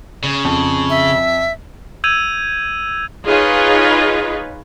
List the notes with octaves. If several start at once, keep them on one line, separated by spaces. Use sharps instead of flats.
C#3
F2
E5
E6 G6 G#6 D#7 F7
D#4 F4 G#4 B4 C#5 D#5